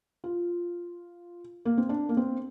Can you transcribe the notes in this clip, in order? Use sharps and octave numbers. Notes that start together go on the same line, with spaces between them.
F4
A#3
C4
D4
A#3
C4